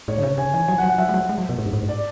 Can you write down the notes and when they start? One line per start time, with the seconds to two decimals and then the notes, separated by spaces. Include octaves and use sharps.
0.08 A2 C#5
0.18 D3
0.23 C#3
0.38 C#3 G#5
0.54 E3 G#5
0.68 F#3 G#5
0.78 F#5
0.83 F#3
0.89 F#5
0.98 F#3 E5
1.09 G#3
1.14 F#3
1.29 G#3
1.38 F#3
1.49 B2
1.58 A2
1.66 G#2
1.73 A2
1.83 G#2
1.88 D5